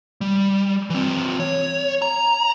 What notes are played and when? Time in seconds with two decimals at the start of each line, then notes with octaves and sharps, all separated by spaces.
0.21 G3
0.90 E3 C4
1.40 C#5
2.02 A#5